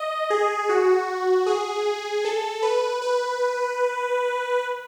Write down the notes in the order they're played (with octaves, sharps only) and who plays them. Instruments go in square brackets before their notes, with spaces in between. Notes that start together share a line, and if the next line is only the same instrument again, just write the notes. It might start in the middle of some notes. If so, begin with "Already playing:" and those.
Already playing: [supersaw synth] D#5
G#4
F#4
G#4
A4
B4
B4